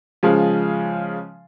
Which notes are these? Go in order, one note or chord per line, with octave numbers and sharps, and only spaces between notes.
C#3 F3 G#3